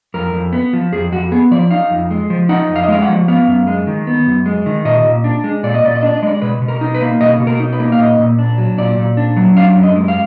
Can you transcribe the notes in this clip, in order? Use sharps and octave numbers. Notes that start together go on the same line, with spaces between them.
F2 A#4
F2
B3
F3
F2 G#4
F2 F#4
B3 G#4
F3 D5
D#4 F5
F2
G#3
F3
D#4 F#5
F2
F5
D#5
G#3 F5
F#5
F3
B3 F5
F#2
G#3
D#3
B3
F#2
G#3
D#3
A#2 D#5
A#2
D4
G#3
A#2 D5
D#5
A#2 D5
D#5
D4 D5
D#5
G#3 D5
B2 B4
B2
A#4
D#4
B4
A#3
B2 D#5
B2
A#4
D#4
B4
A#3
F5
A#2 D#5
A#2
D4
F#3
A#2 D5
A#2
D4
F#3
D4 F5
F#2
D#5
G#3
F5